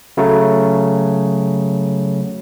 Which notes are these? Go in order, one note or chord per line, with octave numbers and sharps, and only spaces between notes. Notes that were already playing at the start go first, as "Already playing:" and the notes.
C#3 F#3 A3